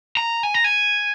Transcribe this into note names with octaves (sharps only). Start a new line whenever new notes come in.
A#5
G#5
A#5
G#5